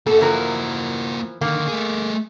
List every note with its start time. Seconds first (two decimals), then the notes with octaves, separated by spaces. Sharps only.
0.07 A#3 F#4 A4
0.21 E3 F3 A#4
1.41 D3 D#3 A#3
1.67 A3 G#4